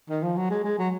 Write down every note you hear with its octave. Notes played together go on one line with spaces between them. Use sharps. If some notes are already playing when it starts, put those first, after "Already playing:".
D#3
F3
F#3
G#3
G#3
F#3